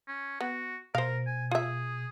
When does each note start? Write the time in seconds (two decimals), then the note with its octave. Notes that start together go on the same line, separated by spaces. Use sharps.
0.08 C#4
0.41 B3 F#4
0.95 B2 A#4 C5 F5
1.27 G#5
1.51 F4 G#4 E5